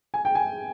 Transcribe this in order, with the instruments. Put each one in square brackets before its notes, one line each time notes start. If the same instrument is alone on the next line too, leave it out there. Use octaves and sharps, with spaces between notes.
[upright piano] G#5
G5
G#5